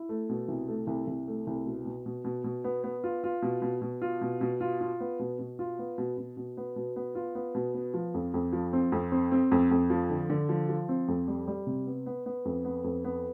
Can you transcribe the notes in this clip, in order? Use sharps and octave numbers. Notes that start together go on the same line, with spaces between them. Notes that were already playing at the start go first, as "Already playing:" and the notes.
Already playing: E4
A3
B2
C2
A3
C2
C2
A3
C2
B2
B2
B2
B2
B2
B3
B3
F4
F4
B2
B2
B2
F4
B2
B2
F4
F4
B3
B2
B2
F4
B3
B2
B2
B2
B3
B2
B3
F4
B3
B2
B3
F3
F2
F2
F3
C4
F2
C4
C4
F2
F2
F3
D3
D3
F3
F3
C4
F2
G3
G3
C3
B3
B3
B3
F2
B3
F2
B3